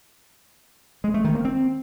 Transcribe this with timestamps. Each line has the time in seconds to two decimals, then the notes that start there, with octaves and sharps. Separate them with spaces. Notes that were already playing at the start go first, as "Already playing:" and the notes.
1.04 G#3
1.14 A3
1.24 D#3
1.35 A#3
1.45 C4